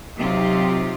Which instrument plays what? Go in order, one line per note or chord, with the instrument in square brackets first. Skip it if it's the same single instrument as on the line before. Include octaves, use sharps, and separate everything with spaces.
[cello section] C3 F#3 C4 D#4 F4 G4